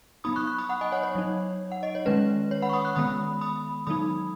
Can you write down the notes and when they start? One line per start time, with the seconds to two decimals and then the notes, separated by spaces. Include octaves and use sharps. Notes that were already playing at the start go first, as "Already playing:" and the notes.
0.24 F#3 B3 D#4 B5 D#6
0.36 C#6 F#6
0.47 C#6 F#6
0.58 B5 D#6
0.69 F#5 B5
0.81 D#5 G#5
0.92 C#5 F#5
1.03 C#5
1.15 F#3 D#4
1.72 F#5
1.83 D#5
1.95 C#5
2.06 D#3 G#3 C#4 B4
2.51 C#5
2.62 F#5 B5
2.69 C#6
2.73 B5 D#6
2.84 C#6 F#6
2.96 D#3 G#3 B3 B5 D#6
3.41 B5 D#6
3.87 D#3 F#3 B3 D#4 B5 D#6